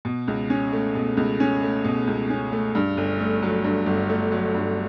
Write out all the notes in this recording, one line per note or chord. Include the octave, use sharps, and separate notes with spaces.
B2
C#2
C#4
A3
B2
C#2
C#4
A3
B2
C#2
C#4
A3
G2
G1
A3
F#3
G2
G1
A3
F#3
G2